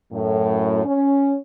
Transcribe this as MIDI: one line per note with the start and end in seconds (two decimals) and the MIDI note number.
0.13 0.85 42
0.13 0.85 45
0.85 1.36 61